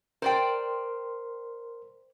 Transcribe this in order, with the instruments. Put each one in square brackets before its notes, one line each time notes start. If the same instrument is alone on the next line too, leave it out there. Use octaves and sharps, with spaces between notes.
[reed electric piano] A#4 C6 [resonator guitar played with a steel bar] C5 D5 G5